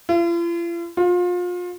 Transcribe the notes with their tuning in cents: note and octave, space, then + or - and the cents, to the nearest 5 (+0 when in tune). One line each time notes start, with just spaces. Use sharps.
F4 -45
F4 +30